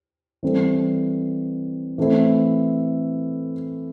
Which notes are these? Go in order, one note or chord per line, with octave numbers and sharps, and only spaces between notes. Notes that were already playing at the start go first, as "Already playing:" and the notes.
E3 G3 C4 A4
E3 A3 C4 E4